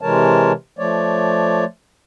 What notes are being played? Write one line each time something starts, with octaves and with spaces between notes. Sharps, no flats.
C3 E3 G#3 A#4 C#5 A5
F3 A3 C#5 D5